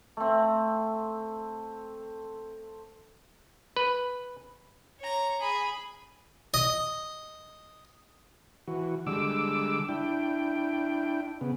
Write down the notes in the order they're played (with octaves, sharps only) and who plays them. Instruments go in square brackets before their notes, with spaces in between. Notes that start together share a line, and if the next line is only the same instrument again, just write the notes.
[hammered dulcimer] A3 C4
[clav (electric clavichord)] B4
[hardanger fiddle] C#5 A#5
G#4 B5
[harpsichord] D#5
[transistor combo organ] E3 F#4
D3 G3 G#3 D6 E6
D4 E4 G5
C#3 B3